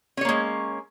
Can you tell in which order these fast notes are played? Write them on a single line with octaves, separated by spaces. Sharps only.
C#4 C#5 A#3 G#3